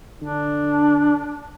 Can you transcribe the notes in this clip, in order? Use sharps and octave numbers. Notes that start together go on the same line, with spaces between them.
D3 D4